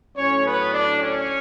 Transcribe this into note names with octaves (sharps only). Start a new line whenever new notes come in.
A2 F#3 C#4 C#5
B3 B4
D4 D5
C#4 C#5